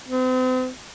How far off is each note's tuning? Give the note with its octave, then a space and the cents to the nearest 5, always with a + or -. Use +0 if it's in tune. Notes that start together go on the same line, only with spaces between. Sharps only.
C4 -40